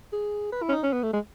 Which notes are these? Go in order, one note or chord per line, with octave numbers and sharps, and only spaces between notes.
G#4
B4
E4
C#4
D#4
C#4
B3
A3
G#3